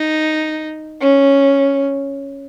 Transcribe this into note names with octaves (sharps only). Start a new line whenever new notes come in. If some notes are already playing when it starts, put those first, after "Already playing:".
Already playing: D#4
C#4